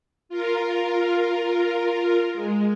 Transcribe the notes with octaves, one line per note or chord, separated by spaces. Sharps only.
F4 A#4
G#3